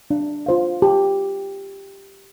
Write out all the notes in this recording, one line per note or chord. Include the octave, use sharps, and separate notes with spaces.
D4
F4 C5 F5
G4